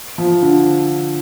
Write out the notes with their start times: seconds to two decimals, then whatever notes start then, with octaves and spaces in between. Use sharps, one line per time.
0.18 F3
0.42 D3